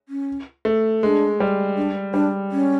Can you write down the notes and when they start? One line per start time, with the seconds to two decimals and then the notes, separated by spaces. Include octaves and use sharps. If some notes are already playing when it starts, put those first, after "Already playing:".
0.09 C#4
0.65 A3
1.02 G#3 D4
1.40 G3
1.77 D4
2.14 G3 D4
2.52 C#4